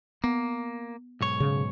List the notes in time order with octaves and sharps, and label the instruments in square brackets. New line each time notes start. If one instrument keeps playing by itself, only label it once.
[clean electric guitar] A#3 [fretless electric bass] B3
[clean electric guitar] B1 G#2 C#5
[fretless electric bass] C#3